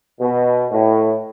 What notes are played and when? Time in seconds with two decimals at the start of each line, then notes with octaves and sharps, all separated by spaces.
0.20 B2
0.70 A2